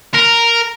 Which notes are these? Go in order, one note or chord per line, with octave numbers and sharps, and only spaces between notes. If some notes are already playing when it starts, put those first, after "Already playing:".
A#4